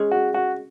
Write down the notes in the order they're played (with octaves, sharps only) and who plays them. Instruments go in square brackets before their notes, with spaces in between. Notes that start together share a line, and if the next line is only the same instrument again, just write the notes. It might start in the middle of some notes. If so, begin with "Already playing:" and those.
Already playing: [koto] G#3 C#4 G#4 C#5
[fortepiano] F#4
F#4